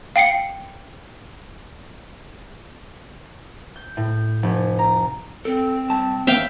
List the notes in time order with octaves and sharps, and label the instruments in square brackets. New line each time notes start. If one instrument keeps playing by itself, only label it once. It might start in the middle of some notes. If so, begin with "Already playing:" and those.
[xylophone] F5 G5 C7 C#7
[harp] G6
A2
F1
A#5
[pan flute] C4 [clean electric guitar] A4
[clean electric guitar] C2 A5
[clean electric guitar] E3 A#3 B3 [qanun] E5 F5 G5